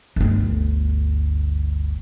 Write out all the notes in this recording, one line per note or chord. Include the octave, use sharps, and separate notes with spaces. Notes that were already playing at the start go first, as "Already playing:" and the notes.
G1 D2